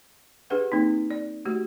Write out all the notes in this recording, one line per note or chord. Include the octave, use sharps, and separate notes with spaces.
D4 G4 G#4 B4 F#5
A#3 C4 D#4
D5
A3 F#4 G4